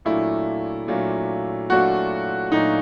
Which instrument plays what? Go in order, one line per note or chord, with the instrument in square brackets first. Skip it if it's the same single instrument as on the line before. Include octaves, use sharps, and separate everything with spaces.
[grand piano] A#2 F#3 A3 D4 F4 [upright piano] E4
[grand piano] A#2 F#3 A3 D4 F4
[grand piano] A#2 F#3 A3 D4 F4 [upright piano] F#4
[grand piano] A#2 F#3 A3 D4 F4 [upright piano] D#4